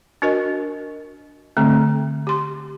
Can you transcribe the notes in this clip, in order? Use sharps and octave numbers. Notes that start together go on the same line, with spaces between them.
D4 F#4 A#4 D#5
D3 A3 C4
G4 C6